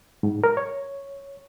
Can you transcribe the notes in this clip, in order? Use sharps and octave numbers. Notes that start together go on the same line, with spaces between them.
G#2
A#4
C#5